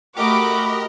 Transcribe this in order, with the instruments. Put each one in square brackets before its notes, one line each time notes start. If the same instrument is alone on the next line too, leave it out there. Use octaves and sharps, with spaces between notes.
[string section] A3 D6 [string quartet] F#4 B5 [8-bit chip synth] G4 A#4 D#5